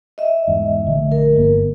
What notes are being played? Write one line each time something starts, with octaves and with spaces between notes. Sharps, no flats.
D#5 E5
E2 G#2
A#1 D3 A3
A#4
G1 A#3 B3